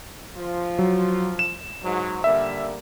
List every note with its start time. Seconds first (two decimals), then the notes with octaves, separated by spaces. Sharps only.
0.36 F3 F4
0.79 F#3
1.39 E7
1.84 G#2 F#3
2.24 D3 G3 A#3 E5